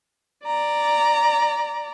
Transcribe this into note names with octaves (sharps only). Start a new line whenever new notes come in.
D5 A#5